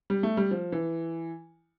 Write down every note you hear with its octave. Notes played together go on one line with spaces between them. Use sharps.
G3
A3
G3
F3
E3